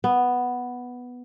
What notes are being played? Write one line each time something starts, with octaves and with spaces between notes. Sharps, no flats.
B3